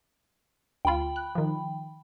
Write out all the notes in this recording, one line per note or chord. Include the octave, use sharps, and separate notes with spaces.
D2 F4 G5 B5
F#6
D#3 F3